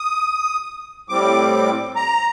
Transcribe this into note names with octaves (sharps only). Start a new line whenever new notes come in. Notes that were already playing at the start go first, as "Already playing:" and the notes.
Already playing: D#6
A2 G3 C4 D6
A#5